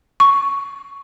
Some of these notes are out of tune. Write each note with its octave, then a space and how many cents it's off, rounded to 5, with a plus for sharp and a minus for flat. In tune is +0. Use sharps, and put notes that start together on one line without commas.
C#6 +5